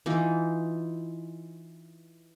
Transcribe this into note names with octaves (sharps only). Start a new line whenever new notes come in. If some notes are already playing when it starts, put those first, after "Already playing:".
E3 D#4 F4